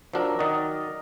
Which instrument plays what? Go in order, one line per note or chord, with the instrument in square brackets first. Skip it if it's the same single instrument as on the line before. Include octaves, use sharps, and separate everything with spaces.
[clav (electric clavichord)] F3 D4 [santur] F#3 A#4 E6
[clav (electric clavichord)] D#3 F#4 [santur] D5 D#5